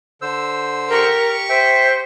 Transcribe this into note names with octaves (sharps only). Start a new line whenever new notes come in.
D3 C5 E6
G4 A#4 C#6
C5 E5 G5